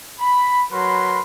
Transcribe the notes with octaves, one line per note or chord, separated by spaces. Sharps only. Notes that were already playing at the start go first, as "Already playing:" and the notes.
B5
F#3 A#4 B4 B5 C6